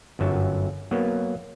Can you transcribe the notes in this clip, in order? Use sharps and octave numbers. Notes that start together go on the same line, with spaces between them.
G1 F#2 F#3 A5
F#3 A#3 B3